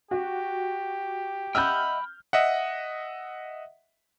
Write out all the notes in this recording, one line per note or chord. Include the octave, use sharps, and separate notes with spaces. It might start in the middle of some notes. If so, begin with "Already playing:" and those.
F#4 G4
D#5 E5 F#5 G5 B5 F6 G6
D#5 E5 F#5